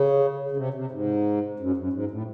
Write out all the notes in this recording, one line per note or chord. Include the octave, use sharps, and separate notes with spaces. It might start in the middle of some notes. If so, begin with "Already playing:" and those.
Already playing: C#3
C#3
C3
C3
G#2
F#2
F#2
G#2
A2